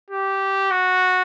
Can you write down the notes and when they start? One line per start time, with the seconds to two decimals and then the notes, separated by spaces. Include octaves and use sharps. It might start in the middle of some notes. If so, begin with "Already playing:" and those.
0.10 G4
0.71 F#4